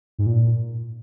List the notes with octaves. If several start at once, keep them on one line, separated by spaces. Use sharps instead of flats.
G#2
A#2